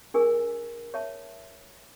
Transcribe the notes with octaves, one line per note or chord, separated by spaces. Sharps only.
D4 G#4 A#4 G#5 E6
C#5 E5 A5